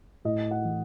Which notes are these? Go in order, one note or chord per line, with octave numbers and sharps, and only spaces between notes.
A2 D#5
F#5
E3